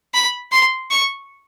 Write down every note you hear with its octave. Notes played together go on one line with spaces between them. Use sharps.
B5
C6
C#6